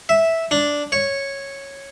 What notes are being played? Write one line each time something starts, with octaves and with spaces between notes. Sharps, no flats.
E5
D4
C#5